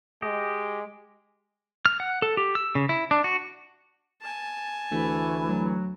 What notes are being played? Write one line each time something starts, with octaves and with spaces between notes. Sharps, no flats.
G#3 G4 D#5
F6
F#5
A4
G4
E6
C#3
E4
D4
F#4
G#5 A5
D2 E3 A3
F#3